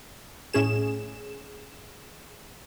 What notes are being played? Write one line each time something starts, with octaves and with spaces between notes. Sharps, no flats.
A2 C#4 G#4 E7